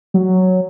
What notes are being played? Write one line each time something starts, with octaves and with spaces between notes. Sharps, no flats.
F#3